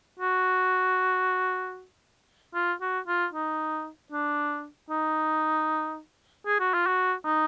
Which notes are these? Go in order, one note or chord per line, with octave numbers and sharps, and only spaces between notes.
F#4
F4
F#4
F4
D#4
D4
D#4
G#4
F#4
F4
F#4
D#4